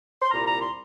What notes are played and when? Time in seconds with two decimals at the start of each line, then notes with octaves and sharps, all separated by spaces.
0.21 C6
0.31 C2 A#2 G3 A#5
0.46 A#5
0.60 C6